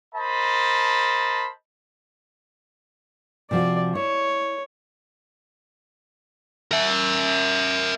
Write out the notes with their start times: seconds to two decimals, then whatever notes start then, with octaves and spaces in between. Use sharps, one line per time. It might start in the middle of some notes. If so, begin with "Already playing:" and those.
0.15 A#4 C5 D#5 A5 B5
3.51 C3 F3 F#4 D5
3.95 E4 C#5
6.71 A#4 E5